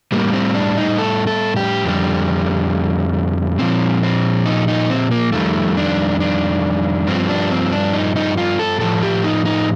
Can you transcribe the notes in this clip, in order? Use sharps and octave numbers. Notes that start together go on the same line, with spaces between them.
A2 G3 A#3
C4
D4
D#4
A4
A4
G4
F2 D3 G3
A#2 F3 C4
C4
D#4
D#4
C4
A#3
F2 D#3 G3 A3
D4
D4
G2 F3 C4
D4
C4
D4
D#4
D#4
F4
A4
A2 F3 A4
G4
D#4
D#4